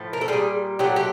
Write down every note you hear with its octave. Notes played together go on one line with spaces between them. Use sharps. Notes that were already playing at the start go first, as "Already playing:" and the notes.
Already playing: A2 F3 A3
A#4
A4
A#2 G3 G#4
A#2 F#3 A3 G4
G4